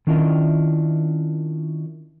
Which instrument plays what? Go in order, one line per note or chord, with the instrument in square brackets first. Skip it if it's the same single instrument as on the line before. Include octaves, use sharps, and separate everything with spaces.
[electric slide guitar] D#3 C#4 D4 E4 F4 D#5